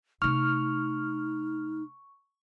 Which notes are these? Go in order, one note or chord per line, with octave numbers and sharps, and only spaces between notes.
C3 A3 D#4 C#6 F6